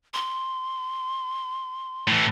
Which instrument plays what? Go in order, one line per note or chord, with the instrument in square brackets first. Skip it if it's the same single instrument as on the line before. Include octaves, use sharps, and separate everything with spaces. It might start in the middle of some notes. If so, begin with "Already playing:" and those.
[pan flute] C6
[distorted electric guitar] A2 E3